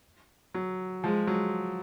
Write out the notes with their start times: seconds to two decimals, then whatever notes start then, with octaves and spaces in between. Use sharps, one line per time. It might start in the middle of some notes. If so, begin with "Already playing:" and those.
0.54 F#3
1.03 F3 G#3
1.27 F#3